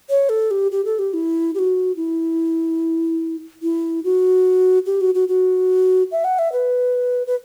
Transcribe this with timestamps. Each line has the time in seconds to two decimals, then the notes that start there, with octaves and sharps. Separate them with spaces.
0.10 C#5
0.29 A4
0.51 G4
0.72 G4
0.85 A4
0.99 G4
1.14 E4
1.55 G4
1.59 F#4
1.96 E4
3.63 E4
4.04 F#4
4.86 G4
5.01 F#4
5.15 F#4
5.28 F#4
6.12 E5
6.24 F#5
6.39 E5
6.52 B4
7.27 B4